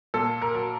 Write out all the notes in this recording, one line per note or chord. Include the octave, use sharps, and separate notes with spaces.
A#2 A4
A#4
F#3